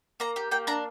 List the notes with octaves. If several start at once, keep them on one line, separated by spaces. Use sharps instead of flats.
A#3 A#5
G4
A#3 G5
D4 A#5